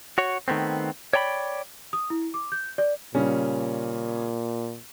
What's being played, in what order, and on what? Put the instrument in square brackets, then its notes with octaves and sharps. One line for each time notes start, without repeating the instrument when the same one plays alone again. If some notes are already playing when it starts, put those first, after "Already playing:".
[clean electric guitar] F#4 C#5
D#3 A3 B3 C4
C#5 D5 G5 A#5 B5
[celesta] D#6
E4
D6
G6
D5
[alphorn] A#2 [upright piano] C#3 G3 C#4